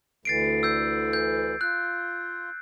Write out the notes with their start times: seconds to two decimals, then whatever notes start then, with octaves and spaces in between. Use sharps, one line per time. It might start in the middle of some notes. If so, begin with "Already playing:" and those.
0.25 D2 D3 E3 A6 C7 D7
0.63 E6 G6 C7
1.13 G6
1.61 F4 F#6